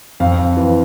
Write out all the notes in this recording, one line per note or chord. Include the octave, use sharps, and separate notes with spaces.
F2 F5
F2
E3